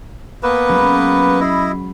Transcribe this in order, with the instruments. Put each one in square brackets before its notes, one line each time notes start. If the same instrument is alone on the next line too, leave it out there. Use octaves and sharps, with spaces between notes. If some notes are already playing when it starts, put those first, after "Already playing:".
[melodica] A#3 B3 B4 [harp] G#5 E6
[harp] F#3 G#3 C#4
[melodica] E4 D#5 [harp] B5 C7